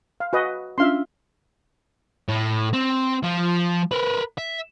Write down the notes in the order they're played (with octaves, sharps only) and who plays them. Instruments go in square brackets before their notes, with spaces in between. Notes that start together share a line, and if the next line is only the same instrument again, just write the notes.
[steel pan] F5
[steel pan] F#4 B4 D#5 [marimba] F#5 G#5
[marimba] C#4 D4 F4 [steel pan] E5 F5 C6
[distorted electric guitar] A2
C4
F3
A#4 B4
E5